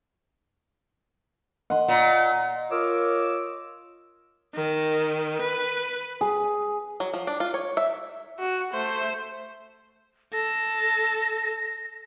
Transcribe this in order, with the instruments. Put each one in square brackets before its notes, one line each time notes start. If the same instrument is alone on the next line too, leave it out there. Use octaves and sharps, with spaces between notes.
[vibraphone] D#5 [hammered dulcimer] F#5 C6
[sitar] A#2
[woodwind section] F4 A#4 C#5 D#5 D6 E6
[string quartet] D#3
B4
[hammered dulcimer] G#4
[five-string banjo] F#3
F3
D4
F4
C#5
E5
[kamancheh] F#4
A3 C5
[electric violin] A4 [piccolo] A#6